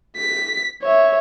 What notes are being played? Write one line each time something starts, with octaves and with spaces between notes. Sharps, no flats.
B6
C#5 E5